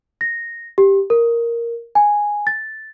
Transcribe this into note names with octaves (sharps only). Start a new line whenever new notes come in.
A#6
G4
A#4
G#5
A6